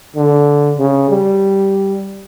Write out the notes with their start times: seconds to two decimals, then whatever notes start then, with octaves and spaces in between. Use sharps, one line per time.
0.16 D3
0.79 C#3
1.10 G3